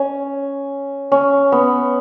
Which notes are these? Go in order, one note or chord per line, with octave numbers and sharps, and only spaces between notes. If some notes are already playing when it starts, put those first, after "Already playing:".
Already playing: C#4
C#4
B3